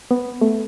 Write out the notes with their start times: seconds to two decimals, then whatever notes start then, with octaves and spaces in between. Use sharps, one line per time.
0.11 B3
0.41 A3